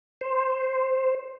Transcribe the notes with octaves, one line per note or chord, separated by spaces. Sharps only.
C5